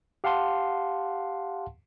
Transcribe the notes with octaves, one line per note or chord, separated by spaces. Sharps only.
G4 F5 F#5 A5 C6